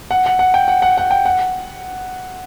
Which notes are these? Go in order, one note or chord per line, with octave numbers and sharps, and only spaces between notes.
F#5
F#5
F#5
G5
F#5
F#5
F#5
G5
F#5